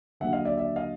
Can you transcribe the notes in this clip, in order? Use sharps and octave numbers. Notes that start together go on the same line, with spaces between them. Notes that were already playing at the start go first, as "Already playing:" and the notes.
D#2 D3 F#3 E5 F#5
D#5 F5
D5 E5
D5 E5
D#5 F5